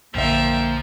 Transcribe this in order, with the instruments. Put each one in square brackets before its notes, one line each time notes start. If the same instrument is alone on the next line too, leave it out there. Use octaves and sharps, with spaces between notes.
[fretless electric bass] A#1 F#2 D3 [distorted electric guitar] F3 [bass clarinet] A#3 [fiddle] E5 G5